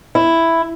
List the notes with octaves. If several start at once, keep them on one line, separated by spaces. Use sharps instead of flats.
E4